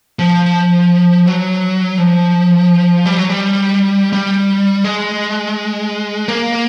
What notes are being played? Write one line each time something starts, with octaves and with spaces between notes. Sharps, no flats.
F3
F#3
F3
G3
F#3
G3
G3
G#3
A#3